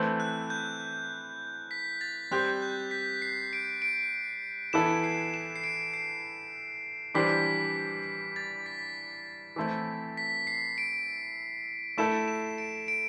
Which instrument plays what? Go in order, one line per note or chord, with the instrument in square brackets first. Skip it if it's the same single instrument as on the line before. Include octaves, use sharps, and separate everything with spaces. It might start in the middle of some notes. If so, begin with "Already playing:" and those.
Already playing: [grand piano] E3 A3 C4 E4 B4
[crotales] F#6
G6
B6
A6
[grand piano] G3 C4 G4 C5 [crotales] F#6
[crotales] G6
B6
C7
D7
D7
[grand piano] E3 B3 E4 A4 [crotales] E7
[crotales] C7
E7
C7
D7
C7
[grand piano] E3 G3 D4 G4 C5 [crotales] B6
[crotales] A6
B6
[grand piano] E3 A3 C4 E4
[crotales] B6
C7
D7
[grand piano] A3 E4 A4 [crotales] E7
[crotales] E7
D7
D7